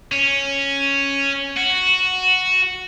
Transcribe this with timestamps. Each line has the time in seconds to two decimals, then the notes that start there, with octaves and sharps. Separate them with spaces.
0.12 C#4
1.57 F#4